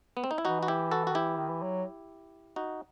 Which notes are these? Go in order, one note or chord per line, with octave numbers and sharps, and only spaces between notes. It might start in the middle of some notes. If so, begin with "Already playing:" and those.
B3
C4
D#4
E4
E3 D#4 F#4
F#4
E4 G4
F#4 A4
F#4
D#3
E3 E4 G4
D#3
E3
F#3
D#4 F#4